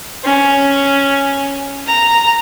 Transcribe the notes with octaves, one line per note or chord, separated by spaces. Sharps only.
C#4
A#5